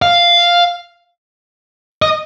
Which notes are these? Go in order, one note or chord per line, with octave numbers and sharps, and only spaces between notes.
F5
D#5